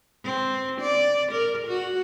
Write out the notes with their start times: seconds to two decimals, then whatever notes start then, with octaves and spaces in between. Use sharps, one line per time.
0.24 C4
0.81 D5
1.32 A#4
1.67 F#4